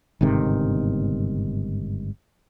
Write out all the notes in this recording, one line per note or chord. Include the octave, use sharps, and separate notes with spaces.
G1 G#2 C3 D#3